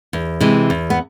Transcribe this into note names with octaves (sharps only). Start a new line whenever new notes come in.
E2
C3 E3 G#3
E2
B3